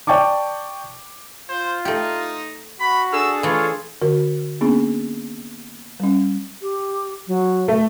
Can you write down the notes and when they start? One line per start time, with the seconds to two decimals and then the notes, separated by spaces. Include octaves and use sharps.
0.07 D5 G5 A5 C#6 D6
1.50 F4 C5
1.85 A3 D#4 G4
2.80 F#4 B5
3.13 D4 G#4 A4 E6
3.43 E3 A3 F4 C#5
4.02 D3 F#4 A#4
4.61 A#3 B3 C#4 D4 G#4
6.00 G3 C#4
6.62 G4
7.28 F#3
7.68 A3